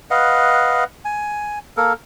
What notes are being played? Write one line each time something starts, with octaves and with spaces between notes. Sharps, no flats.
B4 D#5 F5 F#5
G#5
A#3 A4 A#4